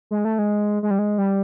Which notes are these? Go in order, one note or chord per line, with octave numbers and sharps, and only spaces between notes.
G#3
A3
G#3
G#3
G3
G#3
G3